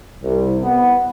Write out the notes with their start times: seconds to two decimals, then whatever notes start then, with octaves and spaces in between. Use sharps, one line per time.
0.22 C2
0.63 B3